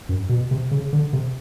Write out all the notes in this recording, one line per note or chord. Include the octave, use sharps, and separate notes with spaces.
F#2
B2
C3
C#3
D3
C3